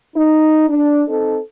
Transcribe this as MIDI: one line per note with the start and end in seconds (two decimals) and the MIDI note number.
0.17 0.68 63
0.69 1.03 62
1.08 1.37 60
1.08 1.37 63
1.08 1.37 69